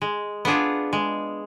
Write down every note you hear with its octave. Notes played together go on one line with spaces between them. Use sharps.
G#3
B3 D4 F4 G#4
G#3